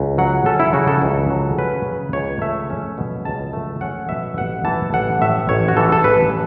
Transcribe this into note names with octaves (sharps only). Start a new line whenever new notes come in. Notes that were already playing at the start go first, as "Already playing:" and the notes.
Already playing: C#2
F#3 F#5
C#4 A4
E4
C#3 F#4
A4
C#2
F#3
C#4 B4
C#3
C#2 C#5
A3 E5
C#4
B2
C#2 A5
A3
C#4 F#5
B2 E5
A1 F#5
E3 A5
A1 F#5
A2 E5
A1 C#5
F#4
E3 A4
A4
A1 B4